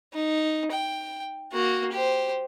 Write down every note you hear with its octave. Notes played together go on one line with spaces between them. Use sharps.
D#4
G5
A#3 F#4
G4 C5